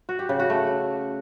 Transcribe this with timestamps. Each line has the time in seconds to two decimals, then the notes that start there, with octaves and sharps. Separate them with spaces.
0.09 F#4
0.19 G4
0.29 C#3
0.40 F#4
0.50 A3